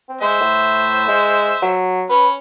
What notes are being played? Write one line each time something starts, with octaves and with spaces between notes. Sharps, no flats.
C4
G#3 C5 E5
A2
G#3
F#3
C#4 B4